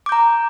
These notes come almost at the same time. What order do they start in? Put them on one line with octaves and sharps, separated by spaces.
D6 G6 A#5